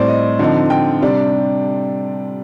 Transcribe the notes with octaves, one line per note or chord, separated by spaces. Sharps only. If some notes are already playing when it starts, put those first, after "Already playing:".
Already playing: A2 G3 C4 C5 D5
D#5
D3 F3 C4 D#4
G5
C3 G3 D4